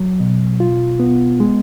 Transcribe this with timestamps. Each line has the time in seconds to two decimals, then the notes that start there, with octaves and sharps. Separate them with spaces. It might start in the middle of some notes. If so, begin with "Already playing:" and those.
Already playing: F#3
0.20 B2
0.60 F4
1.00 B3
1.40 G#3